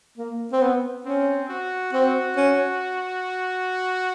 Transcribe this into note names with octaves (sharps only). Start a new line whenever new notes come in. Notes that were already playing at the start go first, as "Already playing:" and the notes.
A#3
C4
B3
C4 C#4
F#4
C4 F#4
C#4